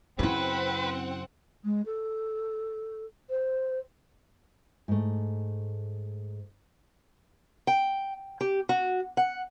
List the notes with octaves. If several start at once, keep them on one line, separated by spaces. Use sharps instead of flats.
F#2 C#3 C4 E4 F4 B4 F#5
G#3
A4
C5
G#2 A3
G5
G4
F#4
F#5